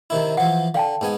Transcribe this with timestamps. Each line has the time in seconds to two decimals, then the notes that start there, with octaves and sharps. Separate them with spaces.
0.10 C3 D#3 E4
0.37 E3 F3 F#5
0.74 D3 F5 G5 A5
1.01 G#2 B3 G#5